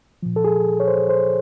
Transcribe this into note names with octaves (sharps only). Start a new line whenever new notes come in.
A#2 F3
A4
G#4
C#5
C5
C5